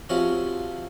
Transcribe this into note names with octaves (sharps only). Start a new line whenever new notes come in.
C3 F3 C#4 F#4